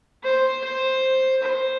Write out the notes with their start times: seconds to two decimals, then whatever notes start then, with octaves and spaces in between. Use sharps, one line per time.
0.24 C5
0.64 C5
1.43 C5